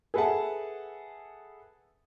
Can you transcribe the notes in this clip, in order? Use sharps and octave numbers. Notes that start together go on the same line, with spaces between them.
G#4 A4 B4 E5 F#5 A5